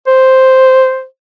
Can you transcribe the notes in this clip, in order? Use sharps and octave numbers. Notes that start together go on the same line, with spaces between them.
C5